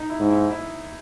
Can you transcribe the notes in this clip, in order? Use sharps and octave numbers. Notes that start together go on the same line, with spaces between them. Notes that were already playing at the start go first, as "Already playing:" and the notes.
Already playing: D#4
E4
G#2
E4
E4